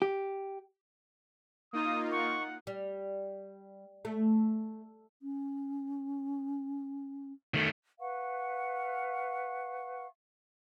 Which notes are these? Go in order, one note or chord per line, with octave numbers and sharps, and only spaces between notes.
G4
A#3 D#4 F4 D#6
F#5 C#6
G3
A3
C#4
D#3 A3
B4 F5 F#5 C#6